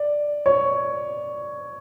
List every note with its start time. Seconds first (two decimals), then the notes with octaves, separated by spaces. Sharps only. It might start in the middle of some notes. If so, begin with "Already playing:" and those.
Already playing: D5
0.46 C#5